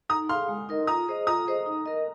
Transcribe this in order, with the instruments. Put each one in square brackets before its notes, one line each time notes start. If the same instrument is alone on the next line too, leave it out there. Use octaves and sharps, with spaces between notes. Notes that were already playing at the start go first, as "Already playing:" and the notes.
[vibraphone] D#4 [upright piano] A#5 D#6
[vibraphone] G#4 F5 [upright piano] C6 F6
[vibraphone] G#3
D#4 A#4 D#5
[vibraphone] F4 [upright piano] A#5 D#6
[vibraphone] G#4 C5 D#5
[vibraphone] F4 [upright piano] A#5 D#6
[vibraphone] G#4 C5 D#5
D#4
A#4 D#5